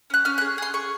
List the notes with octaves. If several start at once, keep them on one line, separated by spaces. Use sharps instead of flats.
C#4 F#6
C#4 F6
F#6
G#4
G#4 C6
G#4 C#6